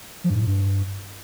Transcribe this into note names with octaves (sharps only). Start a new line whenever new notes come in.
F3
G2
G#2
A2
G2